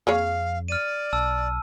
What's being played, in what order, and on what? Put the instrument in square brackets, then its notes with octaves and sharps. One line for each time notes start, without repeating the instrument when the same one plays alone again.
[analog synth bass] F2 [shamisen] A#3 G#4 C#5 [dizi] F5
[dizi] D5 [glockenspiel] F6 D#7
[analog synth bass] B1 [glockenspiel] A5 E6